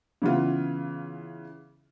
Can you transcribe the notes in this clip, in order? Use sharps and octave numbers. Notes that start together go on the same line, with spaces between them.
C#3 E3 B3 F4